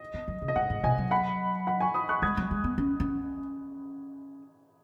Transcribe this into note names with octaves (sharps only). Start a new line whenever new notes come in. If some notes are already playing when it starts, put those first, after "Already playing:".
Already playing: D#5
B3
F#3
C#3
D#5
G#2 F#5
G#2
B2 D#5 G#5
F#3
F#5 B5
F#5 B5
G#5 C#6
B5 D#6
C#6 F#6
G#3 D#6 G#6
F#3
G#3
B3
C#4
C#4